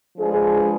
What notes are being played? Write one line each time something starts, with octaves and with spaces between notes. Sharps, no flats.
F3 G#3 D4 G#4 B4